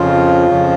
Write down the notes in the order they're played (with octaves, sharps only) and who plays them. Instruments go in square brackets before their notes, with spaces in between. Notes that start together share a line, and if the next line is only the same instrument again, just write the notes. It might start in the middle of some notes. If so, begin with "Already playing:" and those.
Already playing: [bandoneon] F2 C#3 F3 F4
F2 C#3 F3